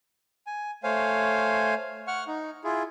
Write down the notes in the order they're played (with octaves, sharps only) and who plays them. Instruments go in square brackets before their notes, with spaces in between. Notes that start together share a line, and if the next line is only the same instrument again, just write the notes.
[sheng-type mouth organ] G#5
A3 C5 C#5 F5 G#5
F#5 C#6 F6
D#4
E4 F4 G#4